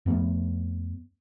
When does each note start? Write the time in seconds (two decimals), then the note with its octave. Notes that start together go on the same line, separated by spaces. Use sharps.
0.06 F2 A3 B3 C#4